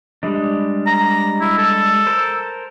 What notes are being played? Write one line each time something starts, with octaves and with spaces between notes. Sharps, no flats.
G3 G#3 D4
A#5
E4
A4
A#4 C5